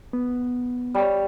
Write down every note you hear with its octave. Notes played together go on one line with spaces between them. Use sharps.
B3
G3 C#5